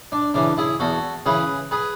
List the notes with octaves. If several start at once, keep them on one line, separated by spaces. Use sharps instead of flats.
D4
C#3 E3 D4
E4 G#4
E2 F#4 A4
C#3 E3 G#4 B4
G#4 B4